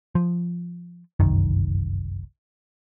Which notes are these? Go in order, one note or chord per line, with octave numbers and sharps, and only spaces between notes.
F3
G1 C2 F#2 D#3